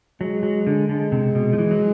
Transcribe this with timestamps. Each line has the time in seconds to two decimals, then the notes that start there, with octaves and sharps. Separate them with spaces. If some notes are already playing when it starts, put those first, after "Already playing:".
0.20 F#3 G#3
0.43 F#3
0.67 D3
0.89 D3 G#3
1.12 C3
1.35 B2
1.53 F3
1.58 E3
1.71 F#3